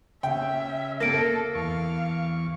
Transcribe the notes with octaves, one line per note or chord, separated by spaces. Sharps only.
C#3 E5 G5
A#3 A4 A#6 D7
E2 F5 C#6